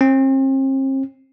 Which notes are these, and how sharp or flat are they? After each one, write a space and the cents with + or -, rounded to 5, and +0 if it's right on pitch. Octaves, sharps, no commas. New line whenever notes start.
C4 +40